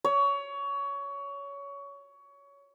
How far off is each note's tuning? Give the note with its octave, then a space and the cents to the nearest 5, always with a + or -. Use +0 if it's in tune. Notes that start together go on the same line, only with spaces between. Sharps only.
C#5 +20